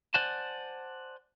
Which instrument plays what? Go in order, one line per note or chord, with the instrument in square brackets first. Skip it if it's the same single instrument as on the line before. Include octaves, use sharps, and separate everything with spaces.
[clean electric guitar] C5 D5 F#5 G#5 A5